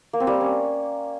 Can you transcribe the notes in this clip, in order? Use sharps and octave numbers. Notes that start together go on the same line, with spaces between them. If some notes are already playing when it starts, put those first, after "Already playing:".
A#3
C4
G3
A#3
C#4